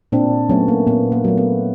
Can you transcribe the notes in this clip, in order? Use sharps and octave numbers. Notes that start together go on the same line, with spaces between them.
A#2 C4 D4
F#3 A3 B3 C#4
A#3
A#2 B3
A#3
F#3 A3
B3